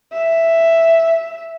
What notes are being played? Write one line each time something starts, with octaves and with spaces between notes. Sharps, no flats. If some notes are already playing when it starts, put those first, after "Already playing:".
E5